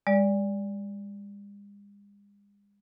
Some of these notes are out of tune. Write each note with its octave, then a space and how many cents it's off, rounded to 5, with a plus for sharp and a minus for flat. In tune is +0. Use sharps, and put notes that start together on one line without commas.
G#3 -45 D5 -10